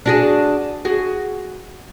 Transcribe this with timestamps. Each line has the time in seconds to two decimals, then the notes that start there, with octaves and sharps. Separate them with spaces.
0.06 D4 F#4 G#4
0.85 F#4 G#4